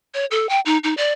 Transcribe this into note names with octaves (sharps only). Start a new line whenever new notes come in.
C#5
A4
G5
D#4
D#4
D5